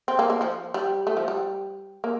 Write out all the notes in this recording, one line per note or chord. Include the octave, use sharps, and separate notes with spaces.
C4
A#3
A#3
F3
G3
A3
F3
G3
A#3